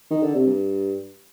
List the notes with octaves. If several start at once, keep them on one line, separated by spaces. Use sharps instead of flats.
D#3
D3
C3
G2